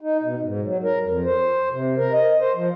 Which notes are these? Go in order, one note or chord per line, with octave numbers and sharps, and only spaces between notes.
D#4
B2
G#2
F#3
A#4
F2
C5
C3
A#4
D#5
C5
F3